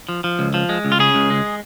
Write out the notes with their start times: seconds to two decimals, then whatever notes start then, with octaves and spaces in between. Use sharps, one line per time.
0.09 F3
0.24 F3
0.39 C#2
0.54 F3
0.69 G#3
0.85 C#2
0.92 F4
0.99 C#3 G#4
1.15 C#2
1.30 G#3